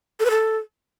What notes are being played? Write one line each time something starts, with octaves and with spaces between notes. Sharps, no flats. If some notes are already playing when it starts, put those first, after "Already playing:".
A4
B4
A4